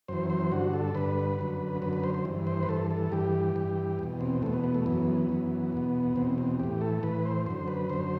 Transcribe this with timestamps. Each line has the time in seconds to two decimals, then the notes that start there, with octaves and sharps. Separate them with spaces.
0.08 F#2 E3 C5
0.30 C5
0.51 G2 D3 F#4
0.73 A4
0.95 G2 D3 B4
1.39 F#2 D3
1.82 F#2 D3 B4
1.93 B4
2.04 C5
2.14 C5
2.25 G2 E3
2.47 C5
2.63 B4
2.69 G2 E3 A4
2.90 A4
3.12 G2 E3 G4
3.56 G2 E3
3.99 E2 B2
4.21 C4
4.42 E2 B2 A3
4.53 B3
4.64 B3
4.74 A3
4.86 F#2 E3 B3
5.29 F#2 E3
5.73 E2 B2
6.16 E2 B2 C4
6.38 C4
6.59 A2 E3 G4
6.81 A4
7.03 A2 E3 B4
7.25 C5
7.46 F#2 D3 C5
7.68 B4
7.90 F#2 D3 C5